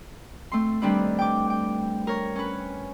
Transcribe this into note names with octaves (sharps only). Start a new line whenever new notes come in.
A3 C4 C6
D#3 G3 C4 D4 B4
G5 D6
G5
A#4 C#5
C#4 B4